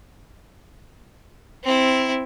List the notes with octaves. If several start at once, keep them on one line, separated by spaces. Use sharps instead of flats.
C4 E4